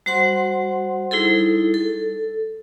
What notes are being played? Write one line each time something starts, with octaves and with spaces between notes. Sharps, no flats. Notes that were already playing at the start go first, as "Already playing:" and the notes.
G3 F#4 C5 F#5 C6
G3 D#4 E4 G#4 A4
A4